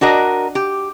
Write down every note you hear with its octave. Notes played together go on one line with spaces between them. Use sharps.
D4 F#4 A#4 D#5
G4